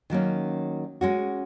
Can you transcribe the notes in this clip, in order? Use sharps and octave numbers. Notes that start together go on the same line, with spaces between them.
D#3 F#3 A#3 C#4
G#3 C#4 F#4